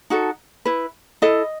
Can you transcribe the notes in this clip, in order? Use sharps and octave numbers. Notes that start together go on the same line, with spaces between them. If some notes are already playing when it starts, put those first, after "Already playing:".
D#4 F#4 A4
E4 B4
E4 A4 D#5